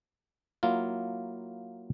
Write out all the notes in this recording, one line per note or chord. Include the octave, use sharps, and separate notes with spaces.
F#3 A#3 E4 F4